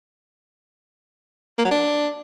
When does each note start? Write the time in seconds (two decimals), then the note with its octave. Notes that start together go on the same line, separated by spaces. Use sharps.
1.58 A#3
1.65 F#3
1.71 D4